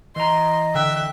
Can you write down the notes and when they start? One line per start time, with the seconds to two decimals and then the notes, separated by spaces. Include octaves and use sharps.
0.16 E3 D#5 A#5 C6
0.75 D3 E5 G5 F#6